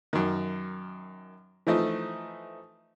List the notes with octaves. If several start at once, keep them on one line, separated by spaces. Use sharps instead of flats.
F#2 D#3
E3 F3 A3 D#4